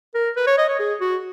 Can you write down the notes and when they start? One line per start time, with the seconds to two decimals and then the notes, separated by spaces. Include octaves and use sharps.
0.14 A#4
0.36 B4
0.47 C#5
0.58 D#5
0.69 C#5
0.79 G#4
1.01 F#4